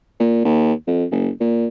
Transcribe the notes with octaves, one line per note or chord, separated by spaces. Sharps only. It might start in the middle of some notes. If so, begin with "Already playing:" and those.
A#2
D#2
F2
F#1
A#2